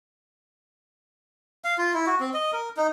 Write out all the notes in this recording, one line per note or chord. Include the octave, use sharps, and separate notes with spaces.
F5
F4
E4
F#4
C4
D#5
A#4
D#4